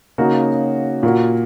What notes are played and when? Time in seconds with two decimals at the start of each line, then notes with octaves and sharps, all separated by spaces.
0.18 C#3 A#3 D#4 F#4
1.03 A#2 A#3 F#4